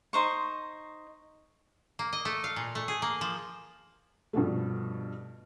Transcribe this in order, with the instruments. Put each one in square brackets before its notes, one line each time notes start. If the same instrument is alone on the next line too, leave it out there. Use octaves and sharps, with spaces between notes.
[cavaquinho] D#4 C5 C#6
[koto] A#3
D#5
A3
F5
A#2
A3
G#4
A#3
F3
[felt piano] G2 B2 F3 A3